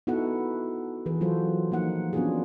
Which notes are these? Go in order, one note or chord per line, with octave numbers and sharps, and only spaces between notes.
B3 D#4 E4 F#4 A4 F#5
E3 G#4 B4
F#3 F4 F#4 A4 C5
F3 A#3 D#4 F#5
B3 C#4 D4 F4 F#4 G#4